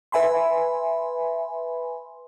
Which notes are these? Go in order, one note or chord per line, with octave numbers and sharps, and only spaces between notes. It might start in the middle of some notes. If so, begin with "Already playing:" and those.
B4 E5 G#5 B5 C6